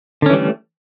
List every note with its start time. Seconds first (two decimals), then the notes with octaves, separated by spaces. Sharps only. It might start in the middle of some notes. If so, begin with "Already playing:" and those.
0.22 D3
0.26 C#4
0.30 E3
0.33 G3
0.37 A3